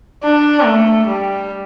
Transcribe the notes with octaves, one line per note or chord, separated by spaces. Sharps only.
D4
A3
G3